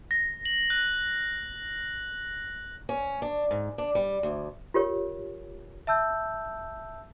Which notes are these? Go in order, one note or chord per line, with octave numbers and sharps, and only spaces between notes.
A#6
F#7
F#6
C#4
D4
G#2
D4
G3
D2
F4 G4 A#4 C#5
E5 A5 E6 G6